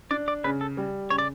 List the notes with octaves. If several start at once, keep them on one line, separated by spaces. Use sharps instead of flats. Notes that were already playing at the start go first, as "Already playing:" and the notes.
D4 D5
D5
C#3 B4
A4
G3
C#3 C#5
D5